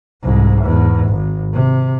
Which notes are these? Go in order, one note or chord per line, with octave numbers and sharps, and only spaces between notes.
C2 G#2
E2 G#2
G#1
C3